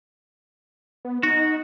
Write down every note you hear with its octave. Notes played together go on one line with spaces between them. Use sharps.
B3
D#4 F#4